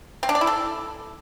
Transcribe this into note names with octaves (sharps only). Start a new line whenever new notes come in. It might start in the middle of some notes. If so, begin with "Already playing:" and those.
C4
D4
D5
E4
A4